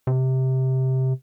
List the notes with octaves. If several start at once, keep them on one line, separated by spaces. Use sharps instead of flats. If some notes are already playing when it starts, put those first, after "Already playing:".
C3